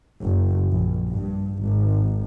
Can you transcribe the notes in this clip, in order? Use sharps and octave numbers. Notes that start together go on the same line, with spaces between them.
F#1
A#1
G2
G#1